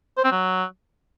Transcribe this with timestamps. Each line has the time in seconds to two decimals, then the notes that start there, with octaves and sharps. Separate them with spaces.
0.18 C5
0.24 C4
0.31 F#3